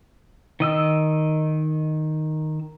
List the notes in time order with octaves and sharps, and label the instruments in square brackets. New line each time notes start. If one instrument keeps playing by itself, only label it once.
[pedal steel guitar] D#3 D#5 E6